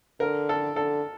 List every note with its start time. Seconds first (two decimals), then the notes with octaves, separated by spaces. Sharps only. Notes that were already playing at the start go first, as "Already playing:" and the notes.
0.20 D3 A#4
0.49 A4
0.76 D3 A4